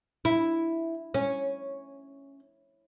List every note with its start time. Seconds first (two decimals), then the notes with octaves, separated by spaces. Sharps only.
0.25 E4
1.14 C#4